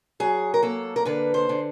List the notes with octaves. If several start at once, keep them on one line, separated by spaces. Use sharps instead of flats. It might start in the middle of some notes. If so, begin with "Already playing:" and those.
F#3 G#4
A#4
A#3 A4
A#4
D3 B4
C5
D3